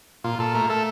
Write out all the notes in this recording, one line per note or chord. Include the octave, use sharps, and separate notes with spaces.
A#2 F4
A#2 A4
A3 A#4
A3 A4